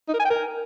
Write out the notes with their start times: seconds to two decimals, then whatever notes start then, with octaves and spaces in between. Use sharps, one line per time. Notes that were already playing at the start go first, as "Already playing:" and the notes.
0.08 D#4
0.14 A#4
0.19 G#5
0.25 G5
0.30 A#4